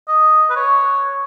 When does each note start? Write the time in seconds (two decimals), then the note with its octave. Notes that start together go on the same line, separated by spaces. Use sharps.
0.08 D#5
0.50 B4
0.56 C#5